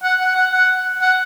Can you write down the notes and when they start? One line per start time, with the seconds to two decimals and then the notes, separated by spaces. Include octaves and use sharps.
0.03 F#5
0.20 F#5
0.35 F#5
0.52 F#5
1.02 F#5